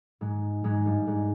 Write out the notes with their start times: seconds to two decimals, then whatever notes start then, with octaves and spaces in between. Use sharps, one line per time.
0.21 G#2 G#3
0.64 G#2 G#3
0.86 G2 G3
1.07 G#2 G#3